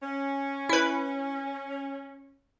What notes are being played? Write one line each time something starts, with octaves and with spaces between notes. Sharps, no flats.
C#4
E4 B4